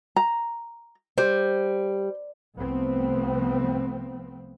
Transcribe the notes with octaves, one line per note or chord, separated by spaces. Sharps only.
A#5
G3 C5
C2 F3 A3 B3 C4